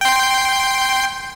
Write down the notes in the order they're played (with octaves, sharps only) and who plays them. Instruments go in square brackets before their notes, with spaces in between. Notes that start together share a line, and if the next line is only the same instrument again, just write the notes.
[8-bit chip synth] G5 C6